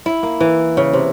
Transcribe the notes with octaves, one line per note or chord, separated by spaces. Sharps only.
E4
A#3
E3
C#3
C3